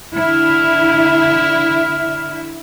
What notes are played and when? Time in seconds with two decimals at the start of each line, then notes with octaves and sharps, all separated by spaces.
0.14 D3 E4 E5 F6